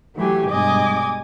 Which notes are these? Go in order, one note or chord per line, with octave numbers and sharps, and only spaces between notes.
E3 F#3 A3 G4 G#5
G2 B2 G#3 D#5 G#5 D6